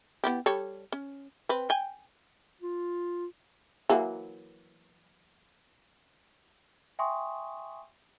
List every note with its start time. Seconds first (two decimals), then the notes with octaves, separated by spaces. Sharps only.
0.24 B3 E4 G4
0.46 G3 A4 C#5
0.92 C#4
1.49 C4 B4
1.70 G5 G#5
2.62 F4
3.89 E3 F#3 A#3
6.99 E5 G5 G#5 C6 C#6 D#6